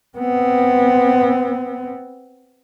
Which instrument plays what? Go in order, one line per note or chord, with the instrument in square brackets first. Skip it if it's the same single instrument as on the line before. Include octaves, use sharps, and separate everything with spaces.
[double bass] B3 C4